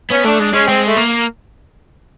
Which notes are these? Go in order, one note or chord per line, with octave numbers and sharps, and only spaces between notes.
B3 C#4
A3 D4
G#3 D4
G#3 C#4
G#3 C4
A3
A#3